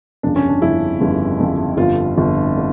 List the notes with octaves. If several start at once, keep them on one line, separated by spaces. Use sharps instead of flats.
G1 F2 C#3 D4
C#4
D4
G1 F2 C#3 E4
G1 F2 C#3
G1 F2 C#3
G1 F2 D3 F4
G1 F2 D3
D3